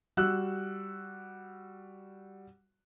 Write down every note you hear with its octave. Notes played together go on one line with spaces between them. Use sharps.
G3 F#4 E6 F#6